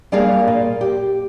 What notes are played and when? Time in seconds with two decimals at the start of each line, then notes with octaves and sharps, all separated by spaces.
0.12 G3 A#3 D4 G#4 D5 F5
0.47 A#2
0.81 G4